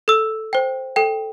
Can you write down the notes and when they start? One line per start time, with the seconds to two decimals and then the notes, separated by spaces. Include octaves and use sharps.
0.08 A4 E6
0.53 C5 G5
0.96 A4 G5